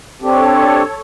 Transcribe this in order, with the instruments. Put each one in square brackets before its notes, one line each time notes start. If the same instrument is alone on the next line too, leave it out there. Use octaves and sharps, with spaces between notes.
[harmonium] C4 D4 G4 [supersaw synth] A4 C#5